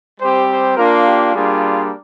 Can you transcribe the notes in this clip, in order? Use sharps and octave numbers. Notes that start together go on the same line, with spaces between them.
G3 C4 G4 C5
C5
A#3 D4 F4 A#4
G4
G3 A#3 D4 F4 G#4